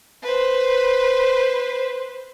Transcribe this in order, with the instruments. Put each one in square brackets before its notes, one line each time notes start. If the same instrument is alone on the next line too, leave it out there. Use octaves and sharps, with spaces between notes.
[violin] B4 C5